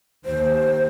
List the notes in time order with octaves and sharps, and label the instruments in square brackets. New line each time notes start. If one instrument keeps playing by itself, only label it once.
[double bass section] D#2 [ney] C5